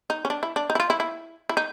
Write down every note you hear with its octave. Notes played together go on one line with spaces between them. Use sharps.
D#4
C#4
D4
E4
D4
D#4
E4
F4
E4
E4
E4
D#4